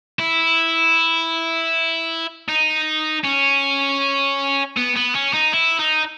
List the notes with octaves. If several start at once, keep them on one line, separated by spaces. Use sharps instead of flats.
E4
D#4
C#4
B3
B3
C#4
D#4
E4
D#4